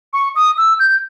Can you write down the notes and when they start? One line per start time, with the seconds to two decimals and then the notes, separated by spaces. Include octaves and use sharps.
0.13 C#6
0.36 D#6
0.58 E6
0.80 G6